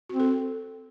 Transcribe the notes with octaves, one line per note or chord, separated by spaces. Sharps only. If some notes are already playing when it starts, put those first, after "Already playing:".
C4 F#4
A4